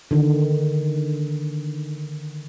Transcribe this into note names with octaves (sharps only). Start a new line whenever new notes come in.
D3 D#3